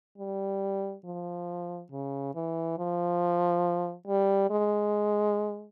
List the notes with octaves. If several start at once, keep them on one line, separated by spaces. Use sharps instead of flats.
G3
F3
C#3
E3
F3
G3
G#3